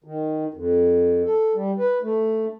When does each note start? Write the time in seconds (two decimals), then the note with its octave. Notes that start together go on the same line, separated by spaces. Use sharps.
0.04 D#3
0.54 F2
1.25 A4
1.54 G3
1.79 B4
2.03 A3